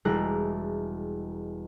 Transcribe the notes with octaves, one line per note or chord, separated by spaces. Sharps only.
E1 G3 G#3 E4 A#5 F#6